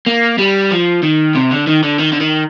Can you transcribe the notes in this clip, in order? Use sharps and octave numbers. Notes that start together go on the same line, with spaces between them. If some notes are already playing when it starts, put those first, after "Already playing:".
A#3
G3
F3
D#3
C3
D3
D#3
D3
D#3
D3
D#3